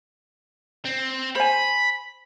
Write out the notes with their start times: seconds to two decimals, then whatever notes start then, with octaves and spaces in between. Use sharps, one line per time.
0.85 C4
1.35 C5 G#5 B5